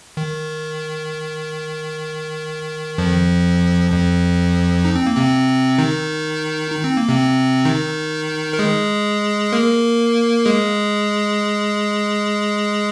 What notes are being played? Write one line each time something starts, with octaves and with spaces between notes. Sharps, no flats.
D#3
F2 F3
F2 F3
D#4
C4
A#3
C3 C4
D#3 D#4
D#4
C4
A#3
C3 C4
D#3 D#4
A#4
G#3 G#4
A#3 A#4
G#3 G#4